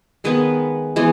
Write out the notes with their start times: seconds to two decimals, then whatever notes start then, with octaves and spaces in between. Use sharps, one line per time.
0.24 D#3 G#3 B3 B4
0.96 E3 G#3 B3